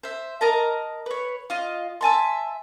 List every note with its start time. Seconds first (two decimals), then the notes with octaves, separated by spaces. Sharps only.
0.03 C5 E5
0.41 A#4 D#5 A5 A#5
1.06 B4 C#5
1.50 F4 D#5
2.01 E5 G#5 A5 C6